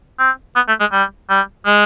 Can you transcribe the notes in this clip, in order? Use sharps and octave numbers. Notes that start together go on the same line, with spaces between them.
C4
B3
A3
G#3
G3
G3
G#3